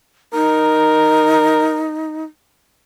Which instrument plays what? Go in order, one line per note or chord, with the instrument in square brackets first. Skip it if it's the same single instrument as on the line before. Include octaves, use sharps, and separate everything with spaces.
[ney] D#4 [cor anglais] A#4